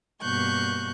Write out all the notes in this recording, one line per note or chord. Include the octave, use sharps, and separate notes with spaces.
G2 B2 A#3 C#6 F#6 G6